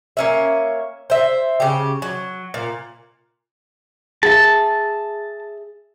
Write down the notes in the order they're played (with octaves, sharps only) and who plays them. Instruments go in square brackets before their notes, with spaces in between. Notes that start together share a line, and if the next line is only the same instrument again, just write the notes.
[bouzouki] A#3 C#4 E5
C5 E5
C#3 G4
F#3
A#2
[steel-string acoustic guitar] G#4 E5 [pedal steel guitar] A5